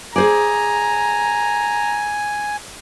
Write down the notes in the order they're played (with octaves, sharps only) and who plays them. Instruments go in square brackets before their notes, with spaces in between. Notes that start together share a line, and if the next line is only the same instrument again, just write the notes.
[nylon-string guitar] G#4 C5 D5 [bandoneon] G#5 [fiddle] A#5